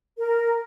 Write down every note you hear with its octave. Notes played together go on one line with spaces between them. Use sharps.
A#4